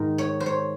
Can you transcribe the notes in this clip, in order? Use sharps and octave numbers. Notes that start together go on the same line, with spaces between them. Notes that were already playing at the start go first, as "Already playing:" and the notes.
Already playing: G#2 D#3 D#5
C#5
C5
C#5